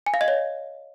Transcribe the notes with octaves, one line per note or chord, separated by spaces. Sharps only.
G#5
F5
D#5
C#5